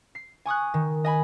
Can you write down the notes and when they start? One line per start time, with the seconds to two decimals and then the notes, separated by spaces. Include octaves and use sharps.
0.15 C7
0.46 G#5 C#6 D#6 F#6
0.74 D#3
1.05 D#5 G#5 B5